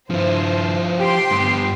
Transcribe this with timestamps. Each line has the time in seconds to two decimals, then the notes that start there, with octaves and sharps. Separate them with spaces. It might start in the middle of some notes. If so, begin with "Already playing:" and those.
0.10 G2 F3 E4 C5
0.99 G4 G5 C6
1.31 G2 B3